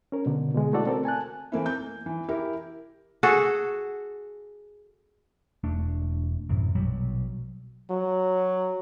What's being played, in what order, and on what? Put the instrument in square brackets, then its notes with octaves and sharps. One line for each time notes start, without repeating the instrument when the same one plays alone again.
[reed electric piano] C#4 A#4
B2 D3
B2 D3 G#3
A3 E4 F#4 A4 D5 F#5
C4 A4 A#4
G#5 A5 F#6
[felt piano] E3 A3 A#3 C4 E4
G6
E3
E4 G4 A#4
[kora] F#4 G#4 A4
[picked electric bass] E1 A3 D4
F#2 A2 C3 E3
A#1 B2 F#3 G3
[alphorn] F#3